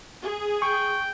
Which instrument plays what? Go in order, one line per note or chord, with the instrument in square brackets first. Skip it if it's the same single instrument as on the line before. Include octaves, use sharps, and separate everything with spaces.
[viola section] G#4
[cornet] G5 [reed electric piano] C#6